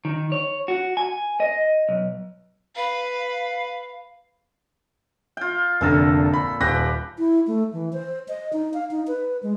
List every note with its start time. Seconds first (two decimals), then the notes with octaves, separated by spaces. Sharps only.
0.05 D#3
0.32 C#5
0.68 F#4
0.97 G#5
1.40 D#5
1.89 B1
2.75 B4 F5
5.37 F4 G5
5.81 F1 A#2 D3 A4 A#4
6.34 B5
6.61 D#1 G4 B4 G5 A#6
7.18 E4
7.47 A3
7.73 E3
7.93 C5
8.28 D#5
8.53 D#4
8.74 F5
8.91 D#4
9.08 B4
9.43 G#3